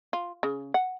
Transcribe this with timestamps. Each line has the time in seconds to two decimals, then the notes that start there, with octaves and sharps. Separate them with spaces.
0.13 F4
0.43 C#3
0.74 F#5